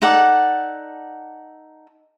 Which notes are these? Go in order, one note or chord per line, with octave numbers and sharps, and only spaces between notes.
D#4 A4 D5 F#5